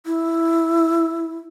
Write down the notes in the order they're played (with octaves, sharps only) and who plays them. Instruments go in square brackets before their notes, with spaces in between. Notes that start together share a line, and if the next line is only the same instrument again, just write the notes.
[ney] E4